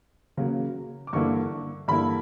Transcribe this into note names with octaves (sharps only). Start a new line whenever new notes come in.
C#3 F#3 A#3
D6
G2 D3 A#3 E4 C#6
G2 D3 A#3 E4 B5